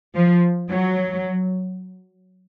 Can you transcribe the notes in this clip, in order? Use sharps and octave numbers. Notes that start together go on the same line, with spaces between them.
F3
F#3